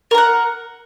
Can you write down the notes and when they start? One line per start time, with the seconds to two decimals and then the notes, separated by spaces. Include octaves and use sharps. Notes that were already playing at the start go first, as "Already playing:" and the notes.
0.11 A#4
0.14 A#5
0.18 F#5